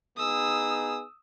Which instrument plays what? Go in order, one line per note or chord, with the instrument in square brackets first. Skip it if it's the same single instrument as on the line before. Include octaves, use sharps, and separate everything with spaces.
[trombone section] B3 D#4 G#4 [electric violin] D#6 E6